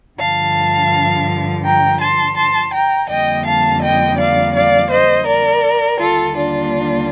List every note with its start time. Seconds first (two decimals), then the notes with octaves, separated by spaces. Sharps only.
0.19 G2 D3 F3 F5 A5
1.64 G5 A#5
2.01 A5 C6
2.37 A5 C6
2.73 G5 A#5
3.10 F2 D3 G3 A#3 D#5 G5
3.46 F5 A5
3.82 D#5 G5
4.19 D5 F5
4.55 D5 F5
4.91 C5 D#5
5.27 A#4 D5
6.00 D#2 D3 G3 A#3 F4 A4
6.36 D4 F4